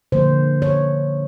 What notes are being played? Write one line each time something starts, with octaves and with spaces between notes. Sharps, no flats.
D3 F3 A#3 C5
C#5